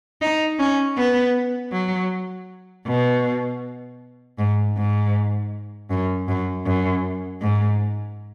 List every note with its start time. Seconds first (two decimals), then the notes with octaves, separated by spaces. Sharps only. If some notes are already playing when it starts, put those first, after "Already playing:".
0.21 D#4
0.59 C#4
0.97 B3
1.72 F#3
2.86 B2
4.39 G#2
4.77 G#2
5.90 F#2
6.28 F#2
6.66 F#2
7.42 G#2